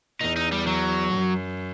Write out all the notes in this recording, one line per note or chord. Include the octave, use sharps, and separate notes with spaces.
E2 D#4
D#4
G3
F#3
F#2